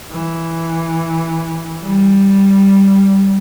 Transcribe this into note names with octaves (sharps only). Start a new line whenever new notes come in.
E3
G3